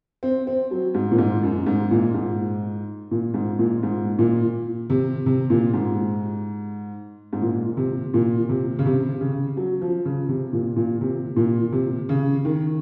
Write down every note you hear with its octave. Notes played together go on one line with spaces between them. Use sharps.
C4
C4
F#3
G#2
A#2
G#2
F#2
G#2
A#2
G#2
A#2
G#2
A#2
G#2
A#2
C3
C3
A#2
G#2
G#2
A#2
C3
A#2
C3
C#3
C3
C#3
F#3
F3
C#3
C3
A#2
A#2
C3
A#2
C3
C#3
D#3